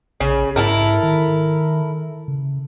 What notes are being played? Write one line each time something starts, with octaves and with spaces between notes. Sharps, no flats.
A#1 C#3
G#2 E4 A4 A#4
D#3
C#3